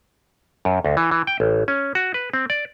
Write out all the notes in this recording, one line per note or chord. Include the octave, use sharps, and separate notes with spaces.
F#2
D2
E3
E3
G5
A1
C#4
F#4
B4
C4
D5